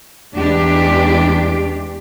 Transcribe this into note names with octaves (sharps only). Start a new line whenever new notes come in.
E2 G#3 D4 G4